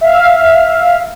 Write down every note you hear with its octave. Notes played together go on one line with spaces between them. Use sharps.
E5 F5